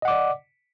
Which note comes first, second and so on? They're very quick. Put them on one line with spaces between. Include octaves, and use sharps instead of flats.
D#5 F#5 D6 D5